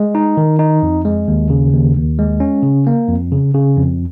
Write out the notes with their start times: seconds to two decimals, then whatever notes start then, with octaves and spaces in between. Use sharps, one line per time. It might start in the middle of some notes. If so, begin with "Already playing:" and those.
Already playing: G#3
0.15 D#4
0.37 D#3
0.59 D#4
0.83 F2
1.05 G#3
1.28 D#2
1.50 C#3
1.72 D#2
1.96 D#2
2.19 G#3
2.40 C#4
2.63 C#3
2.87 A#3
3.09 F2
3.32 C#3
3.54 C#3
3.77 F2